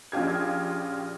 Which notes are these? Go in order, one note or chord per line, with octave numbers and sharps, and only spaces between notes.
A#1 C#4 F4 G4 G#6